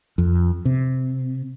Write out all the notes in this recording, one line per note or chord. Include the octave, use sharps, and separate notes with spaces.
F2
C3